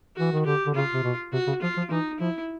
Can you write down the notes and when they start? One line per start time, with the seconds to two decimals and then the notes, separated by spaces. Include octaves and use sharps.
0.17 E3 F#4
0.33 D#3
0.45 D3 G4
0.66 D3
0.75 C#3 F4
0.94 C3
1.04 B2
1.33 C3 F#4
1.47 C#3
1.62 F3 F4
1.77 F3
1.91 E3 D#4
2.20 F3 E4